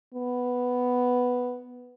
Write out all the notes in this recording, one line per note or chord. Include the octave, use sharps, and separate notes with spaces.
B3